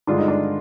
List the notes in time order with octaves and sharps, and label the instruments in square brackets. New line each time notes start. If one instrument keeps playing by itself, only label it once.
[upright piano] G2 D3 G#3 D4 F4
D#4
D4